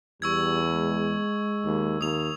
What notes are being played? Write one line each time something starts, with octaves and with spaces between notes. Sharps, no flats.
E2 G3 C#6 E6 G#6
G#3
D#2
D#2 D#6 F7